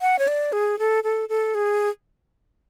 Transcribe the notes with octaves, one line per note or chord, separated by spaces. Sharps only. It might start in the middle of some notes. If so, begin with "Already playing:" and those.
F#5
C#5
D5
G#4
A4
A4
A4
G#4